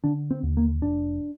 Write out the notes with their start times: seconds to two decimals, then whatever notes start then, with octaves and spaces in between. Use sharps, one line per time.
0.04 D3 D4
0.31 C4
0.43 D#2
0.57 A#3
0.82 F1 D4